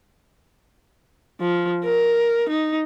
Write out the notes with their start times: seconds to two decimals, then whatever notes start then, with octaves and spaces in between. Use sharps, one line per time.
1.40 F3
1.84 A#4
2.49 D#4